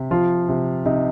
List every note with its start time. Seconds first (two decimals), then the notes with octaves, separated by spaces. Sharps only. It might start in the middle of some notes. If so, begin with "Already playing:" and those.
Already playing: C3
0.11 F3 F4
0.49 C3
0.86 C3 D#4